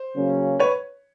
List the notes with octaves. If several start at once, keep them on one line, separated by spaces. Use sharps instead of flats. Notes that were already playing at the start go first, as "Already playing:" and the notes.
Already playing: C5
C#3 F#3 A#3 C#4
B4 C#5